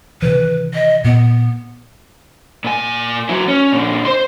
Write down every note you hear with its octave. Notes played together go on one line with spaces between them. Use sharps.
C3 D#3 E3 B4
D#5
A#2 B3
A#2 G#5
F#3 E4
C#4
A#2 D3
C5 C6